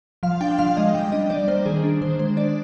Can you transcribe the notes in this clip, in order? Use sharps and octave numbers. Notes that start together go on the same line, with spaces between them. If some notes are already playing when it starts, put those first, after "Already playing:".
F3 F5
D4 G5
F3 F5
G#3 D#5
G3 G5
D4 D#5
G3 D5
A#3 C5
D#3 G#4
D4
D#3 C5
G#3 C5
D4 D5